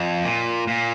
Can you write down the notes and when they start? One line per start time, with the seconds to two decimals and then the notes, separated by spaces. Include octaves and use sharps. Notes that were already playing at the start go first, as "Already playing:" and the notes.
Already playing: F2
0.24 A#2
0.67 A#2